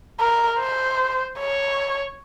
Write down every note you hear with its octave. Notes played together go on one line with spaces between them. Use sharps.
A#4
C5
C#5